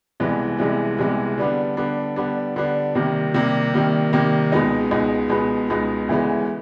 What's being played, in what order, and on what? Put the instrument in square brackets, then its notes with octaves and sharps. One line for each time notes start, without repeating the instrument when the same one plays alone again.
[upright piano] C2 C3 E3 G#3 B3
C2 C3 E3 G#3 B3
C2 C3 E3 G#3 B3
D3 G3 B3 D4
D3 G3 B3 D4
D3 G3 B3 D4
D3 G3 B3 D4
C3 D#3 G3 A#3
C3 D#3 G3 A#3
C3 D#3 G3 A#3
C3 D#3 G3 A#3
C#2 B2 G#3 B3 D#4
C#2 B2 G#3 B3 D#4
C#2 B2 G#3 B3 D#4
C#2 B2 G#3 B3 D#4
D2 C#3 E3 G#3 B3